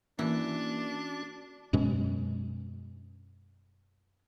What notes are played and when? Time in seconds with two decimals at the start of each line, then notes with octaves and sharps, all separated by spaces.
0.19 E3 A#3 C#4 D4 F#4
1.73 F#2 B2 G#3 C#4